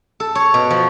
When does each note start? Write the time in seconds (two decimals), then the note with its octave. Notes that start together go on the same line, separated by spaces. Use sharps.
0.20 A4
0.35 C#5
0.54 B2
0.70 F3